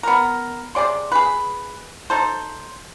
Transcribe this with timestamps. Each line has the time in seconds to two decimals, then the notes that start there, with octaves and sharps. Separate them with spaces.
0.03 B3 A#4
0.75 C3 G#4 D5 C6
1.12 G#4 B4
2.10 D#4 A4 C5